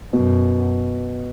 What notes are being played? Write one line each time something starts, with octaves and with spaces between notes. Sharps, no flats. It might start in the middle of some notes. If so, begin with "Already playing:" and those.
F#2 B2